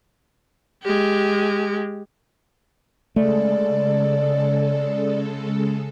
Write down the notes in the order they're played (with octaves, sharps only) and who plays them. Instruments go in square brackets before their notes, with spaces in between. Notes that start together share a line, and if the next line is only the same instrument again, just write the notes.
[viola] G#3 G4
[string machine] C#3 G#3 A4 [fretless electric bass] A3 [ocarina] D5